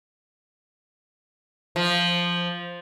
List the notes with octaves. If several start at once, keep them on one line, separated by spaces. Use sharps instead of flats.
F3